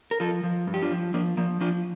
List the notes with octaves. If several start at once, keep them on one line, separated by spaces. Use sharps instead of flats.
A#4
F3 F4 A4
F3
G2
G4
D4 F4
F3
F3 A#3 D4
F3 A#3
F3 D4 F4